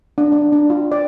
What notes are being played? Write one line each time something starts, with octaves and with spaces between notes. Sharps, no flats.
D4
D4
D4
F4
D5